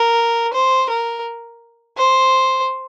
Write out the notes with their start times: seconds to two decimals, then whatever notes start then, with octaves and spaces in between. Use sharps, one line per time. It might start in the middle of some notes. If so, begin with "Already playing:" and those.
Already playing: A#4
0.53 C5
0.89 A#4
1.97 C5